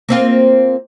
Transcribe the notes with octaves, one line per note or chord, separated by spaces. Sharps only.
A#3 C4 F4